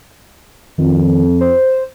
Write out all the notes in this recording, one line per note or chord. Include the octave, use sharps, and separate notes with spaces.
F2 D#3
C5